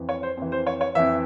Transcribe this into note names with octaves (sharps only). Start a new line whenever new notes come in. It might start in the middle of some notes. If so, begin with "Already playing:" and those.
Already playing: F2 E3
C#5
C5
F2 E3
C5
C#5
C#5
F2 E3 E5